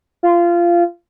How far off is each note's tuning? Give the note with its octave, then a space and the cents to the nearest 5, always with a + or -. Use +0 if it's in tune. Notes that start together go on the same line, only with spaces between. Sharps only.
F4 -20